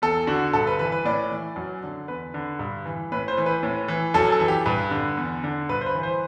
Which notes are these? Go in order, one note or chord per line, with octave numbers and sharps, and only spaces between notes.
E2 A4
D3 F#4
G2 A4
B4
E3 B4
B4
A2 D5
E3
F#2
D3
E2 B4
D3
G2
E3
A2 B4
C5
E3
B4
A2
E3
F#2 A4
A4
E3
G4
G2 B4
D3
E2
D3
G2 B4
C5
B4
E3
C5